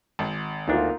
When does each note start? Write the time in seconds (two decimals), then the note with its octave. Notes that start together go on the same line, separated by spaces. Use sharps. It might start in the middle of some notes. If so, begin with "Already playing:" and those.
0.19 G#1
0.68 D2 A#3 D4 D#4 F4